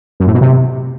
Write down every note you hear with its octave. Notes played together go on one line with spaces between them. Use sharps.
F#2
A2
B2
C3